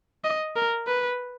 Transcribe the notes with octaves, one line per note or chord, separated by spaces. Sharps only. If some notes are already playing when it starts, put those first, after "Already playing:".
D#5
A#4
B4